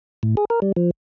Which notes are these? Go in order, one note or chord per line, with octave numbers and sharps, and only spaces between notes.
A2
G#4
A#4
G3
F3